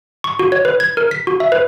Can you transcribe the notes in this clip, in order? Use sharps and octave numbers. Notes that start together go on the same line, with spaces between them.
C#6
F#4
C#5
B4
G#6
A#4
B6
F#4
E5
B4